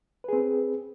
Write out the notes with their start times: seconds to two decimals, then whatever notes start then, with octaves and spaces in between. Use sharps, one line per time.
0.24 B4
0.29 G#4
0.33 C4